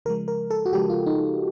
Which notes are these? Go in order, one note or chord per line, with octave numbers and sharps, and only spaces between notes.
C#3 F3 G#3 A#4
A#4
A4
F#4
C#3 F3 G#3 G4
F4
D#4